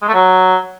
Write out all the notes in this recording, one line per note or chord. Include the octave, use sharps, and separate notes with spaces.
G#3
A3
F#3